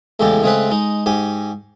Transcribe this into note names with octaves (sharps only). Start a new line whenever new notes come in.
E2 A2 C#3 G#3 G4 A4
C#3 G#3 A3 C4 G#4 B4
G#3 D#4
G#2 G4 G#5